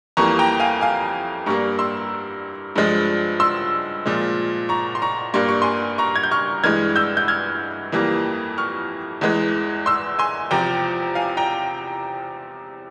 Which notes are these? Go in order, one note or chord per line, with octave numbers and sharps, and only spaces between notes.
F2 E3 G3 A#3 A#5 C#6
G5 A#5
F5 G#5
F5 G#5
G2 G3 A#3 A#5 C#6
C6 E6
G2 F3 G#3
C6 E6
A#2 F3 G#3
A#5 C#6
C6
A#5 C#6
G2 G3 A#3 C6
C#6
G#5 C6
A#5 C#6
G#6
G6
C#6 F6
G2 E3 G#3 F6 G#6
E6 G6
G6
F6 G#6
F2 E3 G3 A#3
C#6 F6
E2 E3 G#3
C6 E6
G#5 C6
E2 C3 F3 G5 A#5
F5 G#5
G5 A#5